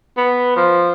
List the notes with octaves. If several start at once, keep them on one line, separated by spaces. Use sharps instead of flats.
B3
F3